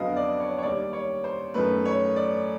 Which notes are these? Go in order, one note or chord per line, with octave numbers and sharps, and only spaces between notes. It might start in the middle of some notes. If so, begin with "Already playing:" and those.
Already playing: F2 D3 F#3 B3 D#5 F5
D5
C#5
C#5
D#2 D#3 G3 D5
C#5
C5
F#2 D#3 F#3 A3 B4
C#5
D5